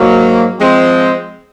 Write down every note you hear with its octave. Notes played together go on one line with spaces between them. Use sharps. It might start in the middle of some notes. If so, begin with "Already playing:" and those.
Already playing: G#2 F#3 A#3
F3 G#3 C4